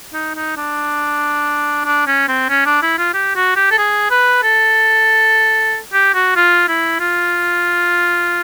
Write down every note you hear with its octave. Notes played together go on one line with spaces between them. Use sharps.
D#4
D#4
D4
D4
C#4
C4
C#4
D4
E4
F4
G4
F#4
G4
A4
G#4
B4
A4
G4
F#4
F4
E4
F4